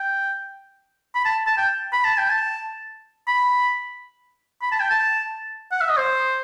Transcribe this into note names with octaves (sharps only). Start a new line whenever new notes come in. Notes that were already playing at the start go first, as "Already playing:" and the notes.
Already playing: G5
B5
A5
A5
G5
B5
A5
G5
A5
B5
B5
A5
G5
A5
F#5
E5
D#5
C5